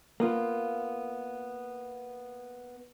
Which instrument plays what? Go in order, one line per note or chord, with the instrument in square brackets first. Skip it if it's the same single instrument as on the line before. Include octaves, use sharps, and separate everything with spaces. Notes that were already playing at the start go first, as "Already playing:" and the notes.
[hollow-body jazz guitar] A#3 B3 F4